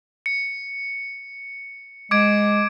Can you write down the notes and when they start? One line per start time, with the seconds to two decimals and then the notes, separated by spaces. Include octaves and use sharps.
0.26 C#7
2.11 G#3 D6 G#6 D7